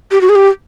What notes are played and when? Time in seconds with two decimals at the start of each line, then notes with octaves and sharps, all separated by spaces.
0.11 G4
0.21 F#4
0.29 G#4
0.35 G4